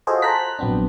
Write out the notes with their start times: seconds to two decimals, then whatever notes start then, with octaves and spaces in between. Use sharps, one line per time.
0.07 F4 F#4 G#4 A4 C5 D#5
0.22 C5 A5 A#5 F#6 B6
0.59 A#1 F#3 B3 C4 D4